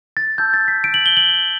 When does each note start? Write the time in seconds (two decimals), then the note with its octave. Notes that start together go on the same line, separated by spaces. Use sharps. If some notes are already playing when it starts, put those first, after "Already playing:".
0.17 A6
0.38 A5 E6 G6
0.54 A6
0.68 B6
0.84 D7
0.94 F#7
1.06 G7
1.17 F#7